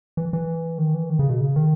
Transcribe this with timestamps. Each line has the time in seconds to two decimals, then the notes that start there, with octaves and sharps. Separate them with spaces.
0.17 E3
0.33 E3
0.78 D#3
0.94 E3
1.10 D#3
1.19 C#3
1.30 B2
1.40 C#3
1.56 D#3